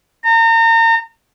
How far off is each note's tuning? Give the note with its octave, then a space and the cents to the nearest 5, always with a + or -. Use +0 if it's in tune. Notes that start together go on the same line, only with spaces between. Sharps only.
A#5 -35